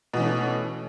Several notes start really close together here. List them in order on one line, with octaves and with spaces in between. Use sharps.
B2 E3 C#4 A3